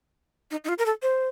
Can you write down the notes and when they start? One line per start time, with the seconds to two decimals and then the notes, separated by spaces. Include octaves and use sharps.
0.51 D#4
0.64 D#4
0.69 F4
0.79 A#4
0.86 A4
1.02 C5